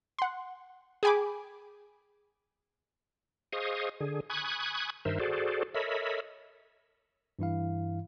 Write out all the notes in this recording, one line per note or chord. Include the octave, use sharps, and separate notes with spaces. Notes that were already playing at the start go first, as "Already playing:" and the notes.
F#5 C6
G#4 G5 G#5 B5 D6
G#4 C5 D#5 F5 C#6 D#6
D3 G#4
G#5 B5 C#6 D#6 F#6 G#6
G2 D#3 A#4 C5 E5
F#4 G#4 A4 C5 D5
A4 A#4 C#5 D#5 E5 B5
G2 E3 E4 F5